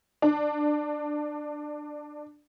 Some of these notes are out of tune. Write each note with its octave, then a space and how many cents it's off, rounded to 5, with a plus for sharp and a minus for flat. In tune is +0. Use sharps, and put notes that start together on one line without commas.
D4 +15